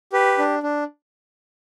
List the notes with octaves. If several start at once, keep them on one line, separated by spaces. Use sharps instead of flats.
G4 B4
D4
D4